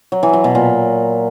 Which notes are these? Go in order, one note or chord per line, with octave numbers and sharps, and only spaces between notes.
F#3
E3
F#3
B2
A#2